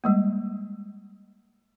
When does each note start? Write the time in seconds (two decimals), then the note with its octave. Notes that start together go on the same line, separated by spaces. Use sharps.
0.04 G3 G#3 A#3